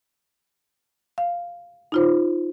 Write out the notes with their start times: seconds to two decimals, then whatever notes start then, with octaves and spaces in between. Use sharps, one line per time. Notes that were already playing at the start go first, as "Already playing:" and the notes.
1.18 F5
1.92 D#4 F4 C5